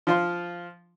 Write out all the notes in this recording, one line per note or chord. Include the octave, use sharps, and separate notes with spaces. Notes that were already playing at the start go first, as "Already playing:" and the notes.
F3 F4 C5